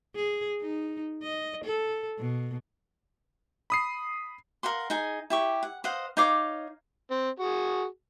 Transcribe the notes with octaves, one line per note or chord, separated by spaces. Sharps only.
G#4
D#4
D#5
A4
B2
B5 D#6 C7
A#4 F5 F#5 C6
D#4 G#4 G#5
E4 G4 C#6
F#5
C5 D#5 F5 F#5
D#4 C#5 F5 D6
C4
F#4 G#4